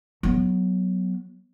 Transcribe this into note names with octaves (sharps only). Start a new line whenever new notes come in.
F#3 B3